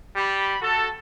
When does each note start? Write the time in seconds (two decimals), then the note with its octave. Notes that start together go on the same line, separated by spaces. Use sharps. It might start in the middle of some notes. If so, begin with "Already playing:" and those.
0.16 G3 G4 B5
0.61 F#4 A4